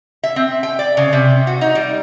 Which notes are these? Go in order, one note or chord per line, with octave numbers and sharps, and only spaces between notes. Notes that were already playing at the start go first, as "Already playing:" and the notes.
E5
C4
G5
D5
C#3
C3
F#4
D#4
G3